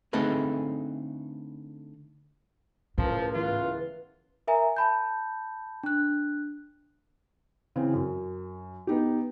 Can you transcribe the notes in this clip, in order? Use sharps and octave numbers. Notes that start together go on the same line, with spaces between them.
D3 A3 C4 D#4 G#4 B4
C#2 A2 F3 G#3 C#4 A#4
E3 B3 F4 F#6
A#4 E5 G#5 A#5
A5 B5 G6
D4 F#6
C#3 E3 C4
F#2
B3 D#4 G4